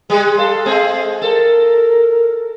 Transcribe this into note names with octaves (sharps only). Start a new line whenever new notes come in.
G3 G#3 G#4
A4 F5
G#3 C4 G#4
A4 A#4